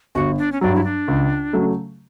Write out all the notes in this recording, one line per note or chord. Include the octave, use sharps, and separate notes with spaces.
G1 F#4
D4
C#4
G2 F#3 D4
E4
D4
C#2
C#3 F#3 A3